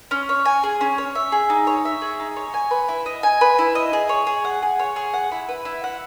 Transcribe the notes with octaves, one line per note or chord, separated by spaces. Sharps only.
C#4
C#5
G#5
G#4
C#4
C#5
E5
G#4
D#4
C#5
E5
G#4
D#4
C#5
G#5
B4
E4
D#5
G#5
B4
E4
D#5
G#4
C#5
G#4
F#5
G#4
C#5
G#4
F#5
E4
B4
E4
F#5